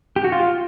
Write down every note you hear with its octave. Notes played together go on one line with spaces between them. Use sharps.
G4
F#4
F4